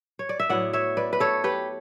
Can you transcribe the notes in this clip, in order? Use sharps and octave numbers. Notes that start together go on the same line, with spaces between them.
C#5
D5
E5
A2 F#3 B3 E4 D5 F#5
C#5 E5
B4 D5
B4
A4 C#5
G4 B4